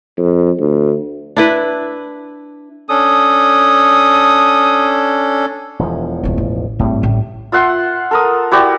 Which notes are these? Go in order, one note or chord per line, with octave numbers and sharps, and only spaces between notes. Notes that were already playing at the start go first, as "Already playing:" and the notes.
F2
D2
D4 E4 B4
C#4 D4 A4 D#6
E1 E2 F3
D1 A3
A1
G#1 A2 G3 A3
A1
F4 E5 F#5 C6
A4 A#4 D#6
E4 F#4 G4 D5